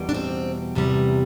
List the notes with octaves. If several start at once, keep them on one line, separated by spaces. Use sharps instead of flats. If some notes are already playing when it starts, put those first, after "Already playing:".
Already playing: E2 B2 G3
D4
C4
E2 C3 G3